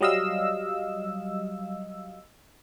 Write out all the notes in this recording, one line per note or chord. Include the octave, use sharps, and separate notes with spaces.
F#3 G3 D#5 F5 E6